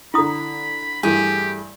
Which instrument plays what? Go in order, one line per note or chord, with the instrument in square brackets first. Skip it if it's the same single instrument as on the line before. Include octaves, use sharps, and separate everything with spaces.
[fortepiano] D3 A#5 [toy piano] E4 D#6 [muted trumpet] B5
[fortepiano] G2 E3 A3 [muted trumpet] G4 [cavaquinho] G#4